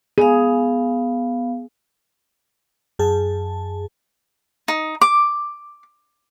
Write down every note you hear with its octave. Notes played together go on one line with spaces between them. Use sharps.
B3 G#4 F5
F#2 G#4 A5
D#4
D6